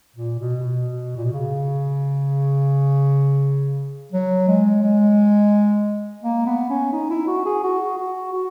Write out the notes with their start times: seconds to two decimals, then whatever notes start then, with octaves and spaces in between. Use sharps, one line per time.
0.16 A#2
0.39 B2
0.62 B2
1.17 A#2
1.25 B2
1.33 C#3
4.12 F#3
4.48 G#3
4.82 G#3
6.23 A#3
6.46 B3
6.70 C#4
6.92 D#4
7.10 E4
7.27 F#4
7.45 G#4
7.63 F#4
7.97 F#4
8.33 F#4